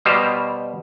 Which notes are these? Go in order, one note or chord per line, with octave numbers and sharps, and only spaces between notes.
B2 G3 G4 C5 D#5 F5